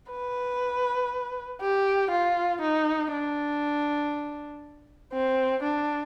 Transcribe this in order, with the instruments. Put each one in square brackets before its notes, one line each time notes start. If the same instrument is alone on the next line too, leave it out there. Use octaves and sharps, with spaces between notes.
[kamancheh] B4
G4
F4
D#4
D4
C4
D4